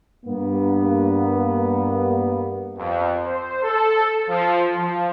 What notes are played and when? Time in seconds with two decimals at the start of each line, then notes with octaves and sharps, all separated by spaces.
0.25 G2 A#3 B3
2.77 F2
3.25 C5
3.63 A4
4.28 F3
4.76 F3